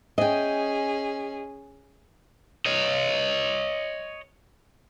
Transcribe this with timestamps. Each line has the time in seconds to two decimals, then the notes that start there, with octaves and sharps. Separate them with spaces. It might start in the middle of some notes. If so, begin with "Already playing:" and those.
0.18 C#4 G#4 D#5 G5
2.66 C#5 D#5